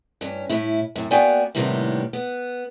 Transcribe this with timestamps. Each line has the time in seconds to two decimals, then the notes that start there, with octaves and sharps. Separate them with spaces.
0.21 G2 C#4
0.49 A2 E4
0.95 F#2 A2 C3
1.11 A#3 B3 F#4 D5 G5 G#5
1.55 A2 C3 D#3 G3 A#3 B3
2.13 B3